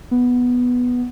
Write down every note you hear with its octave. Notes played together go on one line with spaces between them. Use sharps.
B3